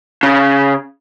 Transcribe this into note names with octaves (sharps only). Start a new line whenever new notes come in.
C#3